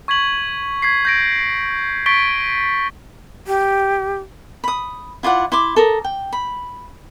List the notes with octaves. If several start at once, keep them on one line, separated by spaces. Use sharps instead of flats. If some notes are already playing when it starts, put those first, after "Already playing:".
C#6 G#6 B6 F#7
G#6 B6 C7
G6 A#6 D7
C#6 A6 B6 D7 G7
G4
B5 D#6
E4 F4 D5 F#5
E4 C6 D6
A4 A#4 D#6
G5
B5